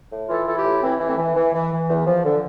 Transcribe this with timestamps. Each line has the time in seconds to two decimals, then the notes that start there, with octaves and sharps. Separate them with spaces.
0.11 A2
0.29 E3 F4 A4
0.45 E3 A4
0.56 E4 G4
0.65 A2
0.82 E3 C4 E4
1.00 E3
1.08 A3 C4
1.18 E3
1.35 E3
1.53 E3
1.71 E3
1.89 E2
2.07 F3
2.25 D3